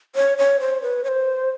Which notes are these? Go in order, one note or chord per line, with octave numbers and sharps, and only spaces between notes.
C#5
C#5
C5
B4
C#5
C5